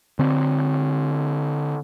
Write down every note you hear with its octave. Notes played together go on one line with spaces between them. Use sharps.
D3 C4